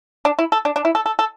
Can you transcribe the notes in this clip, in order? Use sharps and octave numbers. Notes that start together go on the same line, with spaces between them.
D4
E4
A4
D4
D4
E4
A4
A4
A4